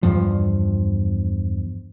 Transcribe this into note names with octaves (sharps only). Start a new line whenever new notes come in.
E2 G2 F3